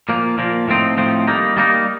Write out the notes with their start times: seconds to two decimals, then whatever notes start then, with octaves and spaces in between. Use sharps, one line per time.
0.09 A#2 F3 A#3
0.38 A#2 F3 A#3
0.68 A2 F3 C4 D#4
0.97 A2 F3 C4 D#4
1.27 G3 A#3 D#4
1.57 G3 A#3 D#4